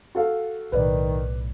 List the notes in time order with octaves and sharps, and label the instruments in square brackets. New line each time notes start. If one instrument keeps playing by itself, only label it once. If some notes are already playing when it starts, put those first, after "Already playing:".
[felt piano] F#4 A4 F5
[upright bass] B1 A2 [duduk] D#3 [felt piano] B4 D5